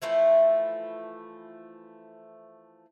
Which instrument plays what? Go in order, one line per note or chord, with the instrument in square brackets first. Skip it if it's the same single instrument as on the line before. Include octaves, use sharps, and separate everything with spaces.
[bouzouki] E3 F3 A3 E4